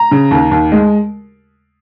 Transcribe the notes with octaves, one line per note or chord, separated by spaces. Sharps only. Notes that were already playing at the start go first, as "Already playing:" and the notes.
Already playing: A#5
C#3
D#2
D#2
G#3